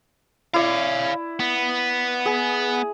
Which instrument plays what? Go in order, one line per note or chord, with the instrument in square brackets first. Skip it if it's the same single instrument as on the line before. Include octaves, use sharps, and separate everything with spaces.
[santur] E4 D5 [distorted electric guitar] C#5 F5
[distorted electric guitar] B3
[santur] G#4